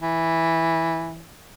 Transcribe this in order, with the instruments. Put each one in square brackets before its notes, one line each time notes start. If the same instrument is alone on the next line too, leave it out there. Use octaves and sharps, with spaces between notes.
[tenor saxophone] E3